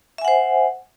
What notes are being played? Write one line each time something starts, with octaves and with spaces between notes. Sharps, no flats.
C5 E5 F#5 G#5